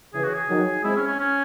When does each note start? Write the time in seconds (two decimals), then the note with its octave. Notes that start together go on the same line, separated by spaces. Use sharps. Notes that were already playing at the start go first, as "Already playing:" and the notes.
0.14 C#3 E3 G#4
0.24 F#4
0.34 G#4
0.49 D#3 F#3
0.84 G#3 C4 E4
0.96 C#4
1.07 C#4
1.19 C#4